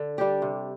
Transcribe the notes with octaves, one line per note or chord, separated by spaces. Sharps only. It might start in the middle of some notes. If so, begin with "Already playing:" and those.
Already playing: D3
G3 D4 G4
C3